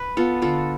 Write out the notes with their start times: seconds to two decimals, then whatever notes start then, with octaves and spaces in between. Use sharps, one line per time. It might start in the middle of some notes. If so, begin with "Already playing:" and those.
Already playing: B4
0.17 B3 F4 A4
0.42 D3 F4 A4